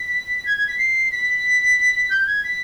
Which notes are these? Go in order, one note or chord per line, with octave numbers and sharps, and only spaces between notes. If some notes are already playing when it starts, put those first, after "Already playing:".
Already playing: B6
G#6
G#6
B6
C7
B6
G6
G#6
B6